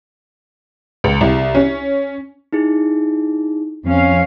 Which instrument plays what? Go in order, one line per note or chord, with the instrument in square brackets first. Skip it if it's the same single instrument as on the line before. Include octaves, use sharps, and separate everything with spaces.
[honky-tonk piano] C#2
C2
C#4
[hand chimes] D#4 E4 G#4
[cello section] F2 C#4 F5